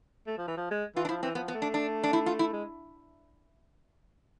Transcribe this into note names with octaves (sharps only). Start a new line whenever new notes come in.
A3
F3
E3
F3
G#3
E3 F4
D4
F3 E4
E3 C4
F3 B3
B3
A3
D4
D4
D4
E4
F4
E4
G#3